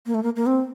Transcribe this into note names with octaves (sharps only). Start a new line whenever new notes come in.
A#3
A3
A#3
A#3
C4